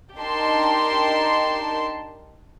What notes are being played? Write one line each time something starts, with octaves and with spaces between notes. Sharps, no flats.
D4 D#4 G4 A#4 A5 C6